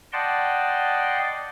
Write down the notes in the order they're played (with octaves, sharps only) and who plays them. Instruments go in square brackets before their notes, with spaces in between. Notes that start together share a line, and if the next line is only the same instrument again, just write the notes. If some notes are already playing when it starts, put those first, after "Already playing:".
[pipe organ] D5 D#5 F#5 G5 A5 C6